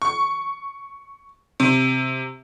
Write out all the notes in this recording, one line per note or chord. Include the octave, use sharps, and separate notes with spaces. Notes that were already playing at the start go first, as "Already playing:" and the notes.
C#6
C3